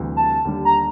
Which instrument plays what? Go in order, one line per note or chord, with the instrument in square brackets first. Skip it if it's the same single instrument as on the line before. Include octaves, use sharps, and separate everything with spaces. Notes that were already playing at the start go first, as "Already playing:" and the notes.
Already playing: [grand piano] D2 C3 E3 G3
[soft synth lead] A5
[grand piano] D#2 D3 G3
[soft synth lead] A#5